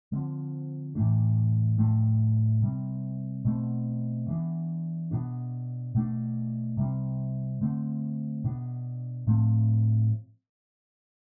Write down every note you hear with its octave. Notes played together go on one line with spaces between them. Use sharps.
D3 F3 C4
A2 E3 A3 D4
A2 F3 A3 D4
C3 G3 C4
B2 A3 C4
E3 B3 D4
B2 B3 D4
B2 A3 D4
C3 G3 C4
D3 A3 C4
B2 B3 D4
A2 F3 A3 C4